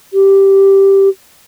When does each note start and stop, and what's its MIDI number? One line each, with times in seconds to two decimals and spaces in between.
0.13 1.08 67